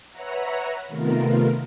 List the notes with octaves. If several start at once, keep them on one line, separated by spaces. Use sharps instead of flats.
B4 C#5 E5 F#5 A#5
C3 D#3 A3 B3 F4 A#4